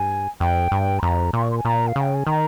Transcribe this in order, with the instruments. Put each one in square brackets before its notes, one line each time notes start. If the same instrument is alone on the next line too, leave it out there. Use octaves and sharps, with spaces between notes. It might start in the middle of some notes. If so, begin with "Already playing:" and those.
Already playing: [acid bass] G2 [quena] G#5
[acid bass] F2 [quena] G5
[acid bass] G2
[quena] C6
[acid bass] F2 [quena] A#5
[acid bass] A#2 [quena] C6
[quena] C#6
C6
G#5
[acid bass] A#2 [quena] A#5
[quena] F5
[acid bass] C#3
[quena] G5
G#5
[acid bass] D#3 [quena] A#5